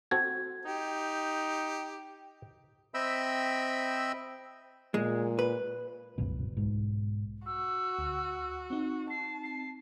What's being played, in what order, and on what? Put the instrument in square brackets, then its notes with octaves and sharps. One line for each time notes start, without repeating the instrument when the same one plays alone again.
[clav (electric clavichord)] C4 F#4 A4 [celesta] G#6
[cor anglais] D#4 [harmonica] G4
[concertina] C4 D#5 E5 G5 B5 E6
[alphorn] A#2 [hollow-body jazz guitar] G#3
[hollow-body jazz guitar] B4
[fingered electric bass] G1 C#2 F#2 B2
B1 G#2
[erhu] F#4 [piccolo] E6
[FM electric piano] D2
C4 D#4
[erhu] A5 [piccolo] C7
[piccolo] C7